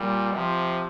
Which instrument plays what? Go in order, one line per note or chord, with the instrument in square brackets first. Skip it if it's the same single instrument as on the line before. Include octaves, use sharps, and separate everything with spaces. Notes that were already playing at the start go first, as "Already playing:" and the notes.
Already playing: [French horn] A#2 [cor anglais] G3
[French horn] C3 [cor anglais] F3